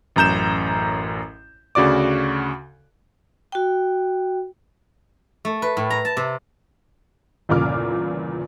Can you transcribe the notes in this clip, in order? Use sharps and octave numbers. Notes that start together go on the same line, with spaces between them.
A1 F#2 A#5 G6 E7
D2 C#3 F#4 D5 D6
F#4 G5
A3
B4
A2
A#5
A5
C3
G1 E2 A#2 C#3 D6 F6